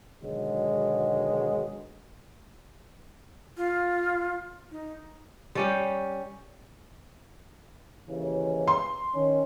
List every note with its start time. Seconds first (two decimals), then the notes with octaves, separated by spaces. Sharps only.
0.21 G#2 B2 D3 D#3 F#3 G#3
3.57 F4
4.71 D#4
5.55 G3 C#4 G4
8.09 D#2 C#3 E3
8.67 C6
9.15 D#3 C#4